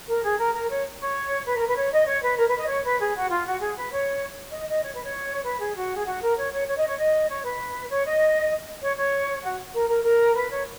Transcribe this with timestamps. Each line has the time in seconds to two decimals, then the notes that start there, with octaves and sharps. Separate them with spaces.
0.09 A#4
0.24 G#4
0.39 A#4
0.54 A#4
0.69 C#5
1.00 C#5
1.46 B4
1.57 A#4
1.67 B4
1.77 C#5
1.92 D#5
2.07 C#5
2.23 B4
2.38 A#4
2.48 B4
2.58 D#5
2.69 C#5
2.84 B4
2.99 G#4
3.15 F#4
3.30 F4
3.46 F#4
3.61 G#4
3.75 B4
3.92 C#5
4.52 D#5
4.68 D#5
4.83 C#5
4.93 B4
5.03 C#5
5.45 B4
5.60 G#4
5.75 F#4
5.96 G#4
6.05 F#4
6.21 A#4
6.37 C#5
6.52 C#5
6.67 C#5
6.77 D#5
6.87 C#5
6.98 D#5
7.29 C#5
7.44 B4
7.90 C#5
8.05 D#5
8.81 C#5
8.96 C#5
9.43 F#4
9.74 A#4
9.88 A#4
10.04 A#4
10.34 B4
10.50 C#5